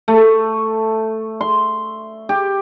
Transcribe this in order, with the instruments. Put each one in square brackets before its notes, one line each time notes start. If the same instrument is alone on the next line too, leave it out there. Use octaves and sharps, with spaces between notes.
[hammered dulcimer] A3
C6
G4